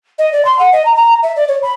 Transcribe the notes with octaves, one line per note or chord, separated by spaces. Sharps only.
D#5
D5
C6
F#5
D#5
A#5
A#5
E5
D5
C#5
B5